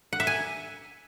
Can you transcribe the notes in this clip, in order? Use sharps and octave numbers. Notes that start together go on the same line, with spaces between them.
F#5
E5
G#5